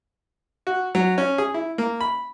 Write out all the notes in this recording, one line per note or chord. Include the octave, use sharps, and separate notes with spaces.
F#4
F#3
C#4
G#4
E4
A#3
B5